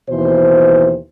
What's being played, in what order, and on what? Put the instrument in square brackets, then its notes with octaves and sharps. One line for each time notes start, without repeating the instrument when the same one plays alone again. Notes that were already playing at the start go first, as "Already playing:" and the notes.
[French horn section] D#2 B2 E3 C5